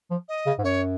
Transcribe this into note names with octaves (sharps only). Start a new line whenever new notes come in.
F3
D#5
C#3
G#2
F#2 C#5